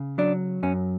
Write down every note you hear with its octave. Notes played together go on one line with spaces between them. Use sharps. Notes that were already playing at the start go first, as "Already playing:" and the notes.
Already playing: C#3
F#3 D4
F#2 C#4